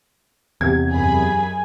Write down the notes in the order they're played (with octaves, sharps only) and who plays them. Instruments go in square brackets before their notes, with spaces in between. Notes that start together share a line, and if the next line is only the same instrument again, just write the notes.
[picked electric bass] E2 C3 [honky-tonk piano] G4 G#6
[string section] F#2 G#4 B5 [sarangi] G#5